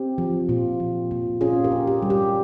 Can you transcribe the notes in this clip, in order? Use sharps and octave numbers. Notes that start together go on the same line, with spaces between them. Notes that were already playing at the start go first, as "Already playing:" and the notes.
Already playing: C4 G4
F3
A#2 F4
F3
A#2
C#4 F4 G#4
G4 A#4
C#4
G4
G3
G4